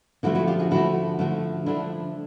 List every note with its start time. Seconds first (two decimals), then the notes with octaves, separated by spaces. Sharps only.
0.23 D3 F3 A3 E4 F#4
0.35 E4 F#4
0.47 F4 G4
0.59 F#4 G#4
0.71 D3 F3 A3 E4 F#4
1.19 D3 F3 A3 E4 F#4
1.66 D3 F3 A3 D4 E4